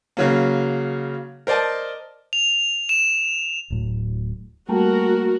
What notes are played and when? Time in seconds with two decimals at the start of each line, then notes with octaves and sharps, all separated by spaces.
0.17 C#3 F#3 A#3
1.47 A#4 C5 D5 D#5 A5
2.33 F7
2.89 E7
3.70 D1 A2 F#3
4.69 G3 A3 A#3 F#4 A#4